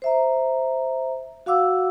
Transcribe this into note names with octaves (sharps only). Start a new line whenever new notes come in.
C5 E5 A#5
F#4 F5 F#5 D6 E6